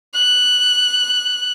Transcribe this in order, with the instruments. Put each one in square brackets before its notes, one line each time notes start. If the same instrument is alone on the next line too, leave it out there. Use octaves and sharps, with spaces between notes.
[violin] F#6